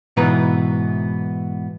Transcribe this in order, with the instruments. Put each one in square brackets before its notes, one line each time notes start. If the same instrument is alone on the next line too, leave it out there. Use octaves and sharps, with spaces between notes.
[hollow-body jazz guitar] G#2 B2 E3 B3 B4 A#5